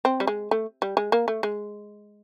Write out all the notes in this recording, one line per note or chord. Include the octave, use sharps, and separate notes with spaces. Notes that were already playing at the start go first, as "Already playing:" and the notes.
C4
G3
G#3
A3
G3
G#3
A#3
A3
G#3